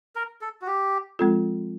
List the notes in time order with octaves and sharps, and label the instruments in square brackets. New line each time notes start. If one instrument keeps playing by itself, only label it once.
[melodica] A#4
A4
F#4
G4
[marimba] F3 G#3 C4 F4 A4